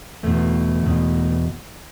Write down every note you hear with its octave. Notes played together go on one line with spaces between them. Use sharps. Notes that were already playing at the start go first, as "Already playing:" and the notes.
E2 B2 A3
E2 B2